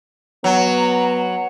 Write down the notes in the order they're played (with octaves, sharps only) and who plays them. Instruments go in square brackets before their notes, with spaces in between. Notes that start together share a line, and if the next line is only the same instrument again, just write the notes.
[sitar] F#3 [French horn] B3 [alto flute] A#5